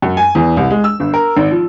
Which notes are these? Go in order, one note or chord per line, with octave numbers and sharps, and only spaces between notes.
F#2
G#5
E2
C2
G#3
E6
G1
A#4
G#1
F3